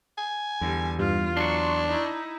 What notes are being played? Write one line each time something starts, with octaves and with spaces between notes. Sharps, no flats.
G#5
E2 D3 G3
G2 F4
F#3 D4 C6 C#6
D#4 E4